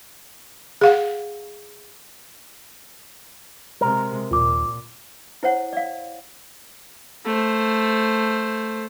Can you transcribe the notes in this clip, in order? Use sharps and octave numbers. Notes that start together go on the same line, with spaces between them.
G#4 F5 F#5
C3 G#3 A#4
D#2 A#2 F4 D6
E4 C5 C#5 F#5
D5 F5
A3 C5